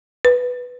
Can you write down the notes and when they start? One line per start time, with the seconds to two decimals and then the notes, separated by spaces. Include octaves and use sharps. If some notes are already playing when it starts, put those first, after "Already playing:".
0.25 B4